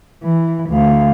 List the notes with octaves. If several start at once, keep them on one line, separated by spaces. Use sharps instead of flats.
E3
D2 F5